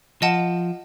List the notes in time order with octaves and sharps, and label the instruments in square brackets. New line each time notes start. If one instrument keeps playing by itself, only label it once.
[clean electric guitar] F3 [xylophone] D#5 F#5 A5